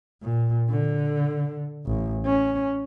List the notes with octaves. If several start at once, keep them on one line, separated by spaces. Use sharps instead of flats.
A#2
D3
A1
C#4